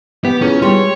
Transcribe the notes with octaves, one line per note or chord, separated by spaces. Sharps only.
B3 G4
C#4 E4 F4 G#4
G3 G#3 G4 C#5 C6